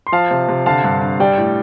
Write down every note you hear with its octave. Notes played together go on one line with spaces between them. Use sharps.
C6
F3 F5 A5
C3
C3
D3 F5 A5
G2
G2
G3 D5 G5
A2